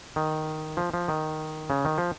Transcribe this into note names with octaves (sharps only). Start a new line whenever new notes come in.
D#3
F3
F3
D#3
C#3
D#3
F3